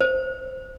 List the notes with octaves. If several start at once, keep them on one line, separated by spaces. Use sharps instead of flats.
C5